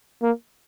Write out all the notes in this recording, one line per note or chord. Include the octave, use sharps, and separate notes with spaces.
A#3